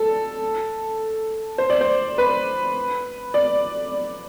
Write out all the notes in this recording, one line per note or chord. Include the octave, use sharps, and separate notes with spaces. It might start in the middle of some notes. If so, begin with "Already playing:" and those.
Already playing: A4
C5
D5
C5
B4
D5